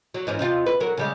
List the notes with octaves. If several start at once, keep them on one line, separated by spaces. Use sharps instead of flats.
F#3
G#2 E3 C#4
C3 D#4 F4
B4
F#3 A#4
C#3 G3 G#3